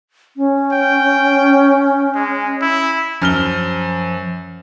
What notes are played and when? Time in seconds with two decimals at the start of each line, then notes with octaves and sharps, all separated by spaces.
0.37 C#4
0.73 G5
2.15 G#3
2.61 E4
3.22 F#2 F3 F6 G7